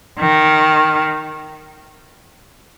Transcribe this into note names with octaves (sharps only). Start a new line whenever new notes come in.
D#3